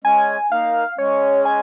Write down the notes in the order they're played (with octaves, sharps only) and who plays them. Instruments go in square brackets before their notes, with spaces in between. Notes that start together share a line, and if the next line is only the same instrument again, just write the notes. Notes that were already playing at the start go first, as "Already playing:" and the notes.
[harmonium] G#3 C#4 [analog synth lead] G#5
[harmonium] A#3 D#4 [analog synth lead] F5
[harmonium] G#3 C#4 [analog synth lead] C#5
[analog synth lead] G#5